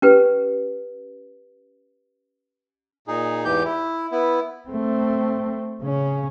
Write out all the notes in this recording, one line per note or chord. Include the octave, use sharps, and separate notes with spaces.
C#4 G4 B4
A#2 D#4 G#4
E2 G#2 E3 G4 G6
E4
B3 E4
A3 C4
C#3 C#4